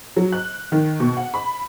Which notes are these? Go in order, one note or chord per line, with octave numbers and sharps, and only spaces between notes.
F#3
F#6
D#3
B2
F#5
B5